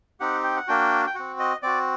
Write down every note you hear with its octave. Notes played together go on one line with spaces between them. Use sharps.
C4 D#4 G4 F#5
G5
F#5
A#3 D4 F#4 G5
G5
C4 F#4 F#5
D#5
C4 F#4 D5